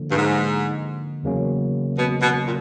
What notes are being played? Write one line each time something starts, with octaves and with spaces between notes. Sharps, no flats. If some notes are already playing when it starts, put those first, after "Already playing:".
Already playing: D3 F3 A#3
G2
G#2
E2 C#3 F#3 A#3 C#4
B2
B2
A#2